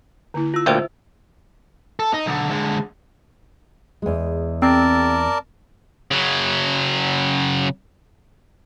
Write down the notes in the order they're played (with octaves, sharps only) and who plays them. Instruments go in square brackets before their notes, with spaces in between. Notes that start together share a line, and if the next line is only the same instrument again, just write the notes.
[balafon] D3 A#3 E4
[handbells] F4 E6
[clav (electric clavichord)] D2 A#2 G5 [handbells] C5 E5
[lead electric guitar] A4
D#4
B1 D3
D3 G#3
[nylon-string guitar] E2 G#3
[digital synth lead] C4 [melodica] A#4 D5 A5
[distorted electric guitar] C#3 F#3